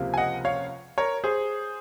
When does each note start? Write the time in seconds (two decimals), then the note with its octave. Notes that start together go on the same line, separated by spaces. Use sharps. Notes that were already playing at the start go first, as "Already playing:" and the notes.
Already playing: C#2 C3 F3 A#3
0.14 G#5
0.18 D#5 F#5
0.45 C#5 F5
0.98 A#4 C#5
1.24 G#4 C5